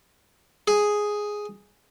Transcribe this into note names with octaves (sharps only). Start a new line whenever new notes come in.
G#4